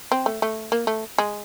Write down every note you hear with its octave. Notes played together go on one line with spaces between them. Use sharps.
C4
A3
A3
A#3
A3
G#3